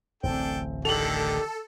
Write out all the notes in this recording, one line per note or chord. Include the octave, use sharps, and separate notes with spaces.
D1 A1 C4 D4 A4 G5
D3 D#3 G4 A4 F7 F#7